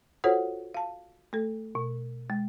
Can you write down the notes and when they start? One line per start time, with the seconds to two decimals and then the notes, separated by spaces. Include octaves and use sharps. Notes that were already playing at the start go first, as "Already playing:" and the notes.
0.24 F4 F#4 A4 C5 C#5 F#5
0.75 F5 A5
1.33 A3 A4
1.75 B2
2.30 G#3